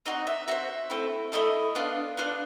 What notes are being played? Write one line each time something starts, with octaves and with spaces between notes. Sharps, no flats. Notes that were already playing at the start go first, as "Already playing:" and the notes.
C4 D#4 F#4 D#5
E5
C4 D#4 F#4 E5
A3 C4 E4 A4
A3 C4 E4 A4 D#5
B3 D4 F4
B3 D4 F4